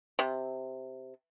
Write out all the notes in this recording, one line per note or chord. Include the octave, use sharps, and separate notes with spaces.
C3